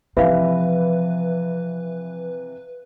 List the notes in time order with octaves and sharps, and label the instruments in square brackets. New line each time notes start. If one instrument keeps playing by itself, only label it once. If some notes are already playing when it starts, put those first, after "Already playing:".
[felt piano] C3 E3 [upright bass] F3 [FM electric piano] B4 [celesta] E5 F5